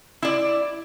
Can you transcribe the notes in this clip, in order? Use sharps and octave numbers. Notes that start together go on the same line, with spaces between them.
E4 D5